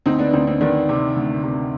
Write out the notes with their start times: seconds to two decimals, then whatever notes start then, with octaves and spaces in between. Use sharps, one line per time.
0.06 D2 C4 D#4
0.19 B3 D4
0.33 D2 C4 D#4
0.47 C4
0.61 D#3 B3 D4
0.89 C3
1.16 D2
1.43 C3